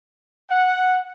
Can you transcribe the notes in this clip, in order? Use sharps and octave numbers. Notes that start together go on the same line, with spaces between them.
F#5